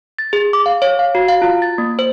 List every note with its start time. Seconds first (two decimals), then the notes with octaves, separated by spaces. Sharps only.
0.19 A6
0.33 G#4
0.53 D6
0.66 F5
0.82 C#5
0.99 F5
1.15 F#4
1.28 F5
1.42 F4
1.62 A6
1.78 A#3
1.99 C5